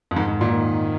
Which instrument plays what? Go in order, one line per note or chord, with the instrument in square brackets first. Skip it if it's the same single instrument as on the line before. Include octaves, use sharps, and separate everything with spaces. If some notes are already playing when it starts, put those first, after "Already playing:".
[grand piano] F2
[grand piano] G#2 [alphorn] D#3
[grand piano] G#2
A#2
[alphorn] D#3